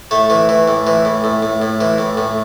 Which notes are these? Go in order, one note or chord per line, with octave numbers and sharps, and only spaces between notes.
A2 A3
E3
E3
A2
E3
A2
A2
A2
A2
E3
A2
A2